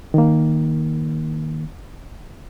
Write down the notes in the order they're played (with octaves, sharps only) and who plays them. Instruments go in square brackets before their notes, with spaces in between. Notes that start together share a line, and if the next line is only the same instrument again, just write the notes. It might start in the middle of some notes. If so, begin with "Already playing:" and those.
[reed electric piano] D#3 A#3